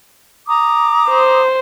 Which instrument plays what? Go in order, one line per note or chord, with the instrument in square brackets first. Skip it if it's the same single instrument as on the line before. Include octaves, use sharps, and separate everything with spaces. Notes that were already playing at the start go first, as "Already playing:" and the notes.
[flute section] A#5 D6 D#6
[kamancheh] C5